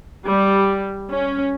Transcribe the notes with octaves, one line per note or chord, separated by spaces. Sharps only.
G3
C#4